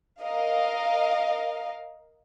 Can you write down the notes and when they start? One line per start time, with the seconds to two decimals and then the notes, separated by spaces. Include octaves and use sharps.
0.21 A#4 D#5 F5